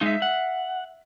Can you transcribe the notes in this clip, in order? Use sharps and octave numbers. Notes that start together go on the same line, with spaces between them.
G#3 D#4 E5 F5
F#5